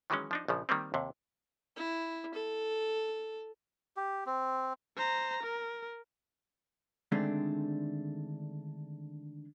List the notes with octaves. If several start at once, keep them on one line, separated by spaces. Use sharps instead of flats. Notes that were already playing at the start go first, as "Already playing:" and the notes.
D#3 E3 F#3 G#3 C#4
F3 D4 D#4
A#1 C#3 F3
D#3 G3 A#3 C4
D#2 C3
E4
A4
G4
C4
C5 A#5
A#4
D3 D#3 G#3 A3 C4 D4